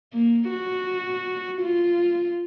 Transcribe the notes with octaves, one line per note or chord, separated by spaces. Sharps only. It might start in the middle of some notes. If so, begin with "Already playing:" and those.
A#3
F#4
F4